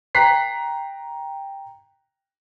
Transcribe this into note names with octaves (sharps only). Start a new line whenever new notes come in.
G5 A#5 F#6 B6 C7